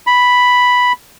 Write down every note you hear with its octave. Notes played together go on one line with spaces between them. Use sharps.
B5